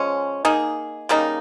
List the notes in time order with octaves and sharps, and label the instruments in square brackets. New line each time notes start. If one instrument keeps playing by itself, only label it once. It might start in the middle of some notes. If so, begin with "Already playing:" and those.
Already playing: [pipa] F3 G#3 C#4
A#3 D#4 G#4
C#3 G3 A#3 D#4